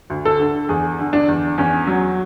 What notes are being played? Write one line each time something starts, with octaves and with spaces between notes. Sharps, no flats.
D2
A4
D3
E2 G#4
D3
D4
E2
E2 C#4
F#3